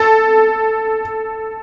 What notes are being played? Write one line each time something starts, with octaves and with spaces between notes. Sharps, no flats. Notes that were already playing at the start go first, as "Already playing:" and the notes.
Already playing: A4